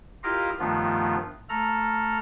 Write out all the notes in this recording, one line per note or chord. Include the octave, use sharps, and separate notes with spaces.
E4 F4 G4 A#4 D#5 F5
G2 D#3 F3 A3 B3 F4
A3 A4 A#5 F6